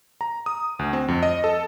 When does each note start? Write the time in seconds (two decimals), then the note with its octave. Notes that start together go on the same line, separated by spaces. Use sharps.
0.21 A#5
0.46 D#6
0.79 D2
0.93 C4
1.08 F2
1.23 D#5
1.44 A4